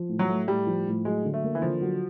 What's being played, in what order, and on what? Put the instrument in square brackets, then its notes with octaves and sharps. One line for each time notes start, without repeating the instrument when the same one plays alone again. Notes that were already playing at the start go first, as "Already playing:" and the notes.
Already playing: [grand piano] F3
A2
[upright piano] F#3
[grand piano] A3
[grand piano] A2 [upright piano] G3
[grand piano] F3
A2
[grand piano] F#3 [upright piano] G#3
[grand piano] D3
[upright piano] A3
[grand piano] A#3
[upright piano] E3
[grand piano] D3 [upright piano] F3
[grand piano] F#3